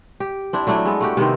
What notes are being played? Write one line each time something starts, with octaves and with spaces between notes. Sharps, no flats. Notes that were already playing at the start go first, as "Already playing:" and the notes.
G4
C4 D4 E4
F#3 A3 D4 E4
G#3 B3 A4
A3 F#4 G4
C3 D#3 B3 C4